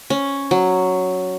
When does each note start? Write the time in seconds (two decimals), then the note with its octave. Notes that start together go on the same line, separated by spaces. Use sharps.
0.10 C#4
0.51 F#3